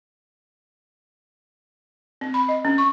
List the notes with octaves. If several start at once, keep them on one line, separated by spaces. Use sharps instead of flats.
C4
B5
D#5
C#4
C#6